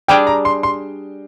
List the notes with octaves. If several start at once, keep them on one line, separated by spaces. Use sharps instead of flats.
G3 D4 G#4 G5
A#5
C6
C6